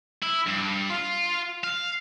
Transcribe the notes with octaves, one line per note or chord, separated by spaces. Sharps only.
E4
G2
F4
F5